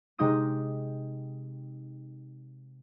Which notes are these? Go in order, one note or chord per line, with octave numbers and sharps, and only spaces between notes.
C3 G#3 D#4 G5 D#6 D#7